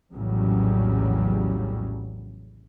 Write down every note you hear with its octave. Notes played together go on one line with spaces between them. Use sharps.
A#1 E2 A2 C#3 F#3 G3